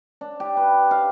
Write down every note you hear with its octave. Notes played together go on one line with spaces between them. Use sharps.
D4
G4
B4
F5